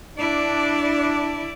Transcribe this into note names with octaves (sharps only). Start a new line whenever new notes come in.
D4 E4 D5